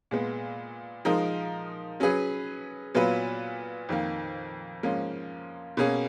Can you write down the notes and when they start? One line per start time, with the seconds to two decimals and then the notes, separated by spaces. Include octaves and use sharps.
0.11 A#2 G#3 B3
1.05 F3 G#3 D#4 A#4
2.00 F#3 C#4 G#4 B4
2.95 A#2 F#3 B3 F4 B4
3.89 F2 D#3 A#3
4.83 G#2 F3 A#3 C#4
5.77 B2 A#3 C#4 G#4